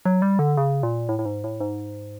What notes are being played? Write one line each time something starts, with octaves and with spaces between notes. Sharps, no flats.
F#3
G3
D3
C#3
A#2
A2
A2
G#2
A2
G#2